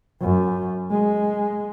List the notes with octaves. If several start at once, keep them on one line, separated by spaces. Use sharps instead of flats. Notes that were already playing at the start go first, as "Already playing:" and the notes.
F#2
G#3